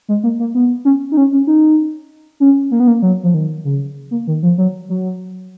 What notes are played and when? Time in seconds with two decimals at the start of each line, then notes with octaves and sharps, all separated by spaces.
0.08 G#3
0.23 A#3
0.40 A#3
0.55 B3
0.85 C#4
1.12 D#4
1.17 C#4
1.32 C#4
1.47 D#4
2.40 C#4
2.71 A#3
2.80 B3
2.87 A#3
3.02 F#3
3.23 F3
3.34 D#3
3.65 C#3
4.11 A#3
4.27 D#3
4.43 F3
4.58 F#3
4.89 F#3